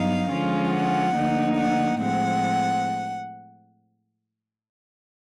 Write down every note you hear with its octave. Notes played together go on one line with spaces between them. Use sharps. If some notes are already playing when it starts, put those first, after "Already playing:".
Already playing: G2 F#3 B3 D#4 F5
D3 F3 G#3 C#4 F4
F#5
D2 D3 F3 A#3 D#4
F#5
A2 F3 G#3 C4 F#5